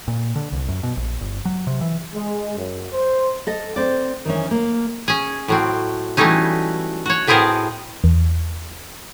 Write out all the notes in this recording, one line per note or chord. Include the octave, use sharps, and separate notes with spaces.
A#2
D3
C2
F#2
B2
A#1
G1
F#3
C3
E3
G#3
F#2
C5
A4 D#5
C4 D5
D#3 E3 C#4
A#3
C#4 G#4
A2 F#3 C4
E3 F#3 G3 A3 C#4 D#4
F#4 C#5
A2 B3 C4 G#4 A#4 A5
E2